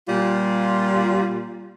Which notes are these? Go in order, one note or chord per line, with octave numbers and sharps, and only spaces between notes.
A#2 G3 F4